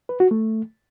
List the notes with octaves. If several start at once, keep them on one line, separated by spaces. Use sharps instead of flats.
B4
F#4
A3